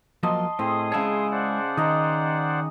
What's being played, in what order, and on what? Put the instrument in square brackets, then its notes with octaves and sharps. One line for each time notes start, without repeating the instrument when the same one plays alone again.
[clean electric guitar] F3 F#3 A#3 [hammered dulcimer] D#5 A5 C6
[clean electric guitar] A2 [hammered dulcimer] C4 [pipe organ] G#4 C6 D#6
[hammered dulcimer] C#3 A5 [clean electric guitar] G#3 E4 C#5
[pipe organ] C5 D5 F#5
[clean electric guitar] D#3 [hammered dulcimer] D#5 A#5